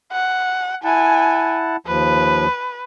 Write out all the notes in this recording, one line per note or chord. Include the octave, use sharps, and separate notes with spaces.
F#5
E4 F#5 G#5 A5
D#2 F3 B4